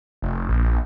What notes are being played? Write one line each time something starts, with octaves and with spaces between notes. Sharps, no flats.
F1
A#1